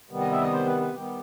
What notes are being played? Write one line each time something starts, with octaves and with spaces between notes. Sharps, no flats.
C3 D#3 G3 B3
D#5
E5
D#5
C5
B4
B4
D#3 G3 B3 G4